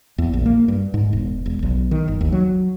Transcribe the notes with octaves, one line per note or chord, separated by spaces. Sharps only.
E2
A#1
A#3
G2
G#2
E1
E1
B1
D#3
G1
D#2
F#3